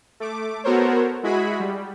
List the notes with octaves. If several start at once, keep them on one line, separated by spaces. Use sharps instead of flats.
A3 D6
B3 F#4 A4 A#4 C5 C#5
G#3 E4 F#4 G#4 B5
G3